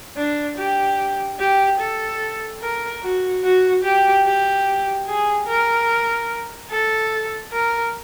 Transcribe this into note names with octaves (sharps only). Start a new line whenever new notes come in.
D4
G4
G4
A4
A#4
F#4
F#4
G4
G4
G#4
A#4
A4
A#4